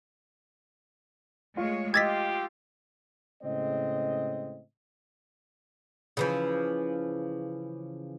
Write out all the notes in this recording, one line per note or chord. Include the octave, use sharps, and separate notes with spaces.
G#3 A3 F4 C#5
F4 G4 D#5 D6 E6 G#6 A6 B6
A2 C#3 G#3 C4 D#5
C#3 E3 F3